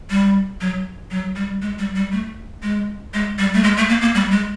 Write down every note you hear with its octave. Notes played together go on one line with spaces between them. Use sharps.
G3
F#3
F#3
G3
G#3
G3
G3
A3
G#3
G#3
G3
A3
G#3
A3
A#3
A#3
G3
G#3